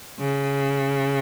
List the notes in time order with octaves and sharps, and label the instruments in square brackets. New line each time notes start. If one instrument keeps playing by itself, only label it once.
[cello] C#3